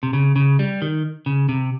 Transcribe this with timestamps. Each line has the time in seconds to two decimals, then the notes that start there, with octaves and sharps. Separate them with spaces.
0.03 C3
0.13 C#3
0.36 C#3
0.59 G3
0.82 D#3
1.26 C#3
1.49 C3